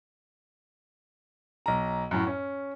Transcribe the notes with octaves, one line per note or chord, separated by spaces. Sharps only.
B1 A#5
F#2 A2
C#4